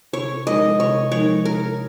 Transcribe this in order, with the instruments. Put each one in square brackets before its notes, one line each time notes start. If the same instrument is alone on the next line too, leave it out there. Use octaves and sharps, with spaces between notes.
[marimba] C3 [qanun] C#5
[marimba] F3 G#3 D#4 A#4 [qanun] D#5
[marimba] C3 [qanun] C#5
[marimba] F3 G#3 D#4 A#4 [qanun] C#5
[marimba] C3 [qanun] A#4